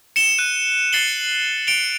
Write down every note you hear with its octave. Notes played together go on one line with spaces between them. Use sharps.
C#7 E7 G7
F#6 D#7
A6 C7 C#7 F#7 G7
C#7 D7 F7 G7